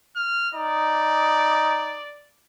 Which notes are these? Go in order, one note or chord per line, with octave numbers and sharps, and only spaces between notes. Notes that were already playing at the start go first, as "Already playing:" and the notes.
F6
D#4 D5